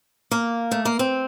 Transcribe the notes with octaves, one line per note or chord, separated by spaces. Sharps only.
A#3
A3
A#3
C4